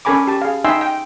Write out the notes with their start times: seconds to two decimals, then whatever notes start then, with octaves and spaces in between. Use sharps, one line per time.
0.05 C#4 A4 A#4 G#5 B5 D6
0.27 G4 A5
0.42 G#4 F5
0.64 D#4 E5 G5 G#5 C6 E6
0.81 G5